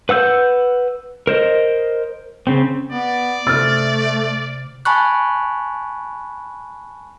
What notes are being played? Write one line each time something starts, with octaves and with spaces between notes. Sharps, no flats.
B4 F#5 E6 G6
A#4 C5 D#5
C#3 C4
B3 D5
C3 A3 F6 A6
G#5 A5 B5 C#6 F#6